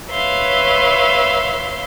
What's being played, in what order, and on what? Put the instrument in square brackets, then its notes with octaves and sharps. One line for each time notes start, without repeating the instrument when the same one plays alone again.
[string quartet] B4 C#5 E5 F5 C6